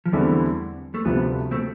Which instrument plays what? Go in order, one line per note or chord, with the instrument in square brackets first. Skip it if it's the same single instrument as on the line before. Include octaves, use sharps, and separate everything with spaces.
[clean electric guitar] F3
[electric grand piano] E2 D3 A3 C4 E4 [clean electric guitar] E3 G3
[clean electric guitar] A3
[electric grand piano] D2 C3 F3 C4 [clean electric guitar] G3 B3
[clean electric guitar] A3 C4